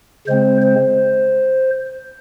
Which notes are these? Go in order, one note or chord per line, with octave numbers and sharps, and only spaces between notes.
C#3 G#3 C4 C5
C5